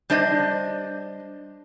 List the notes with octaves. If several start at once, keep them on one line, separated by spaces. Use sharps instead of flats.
G3 D4 C5 D#5